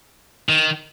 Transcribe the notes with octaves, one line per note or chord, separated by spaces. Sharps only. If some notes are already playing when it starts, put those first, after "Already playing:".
D#3